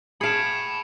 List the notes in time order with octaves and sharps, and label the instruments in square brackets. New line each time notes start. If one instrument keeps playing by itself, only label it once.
[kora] G#4 F5 [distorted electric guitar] A5 B5 [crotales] C#7 D7 E7